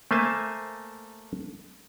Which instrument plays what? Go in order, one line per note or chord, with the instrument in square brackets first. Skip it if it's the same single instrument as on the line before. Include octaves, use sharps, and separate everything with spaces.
[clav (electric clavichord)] A3 A#3 C5 E5 G#5 A5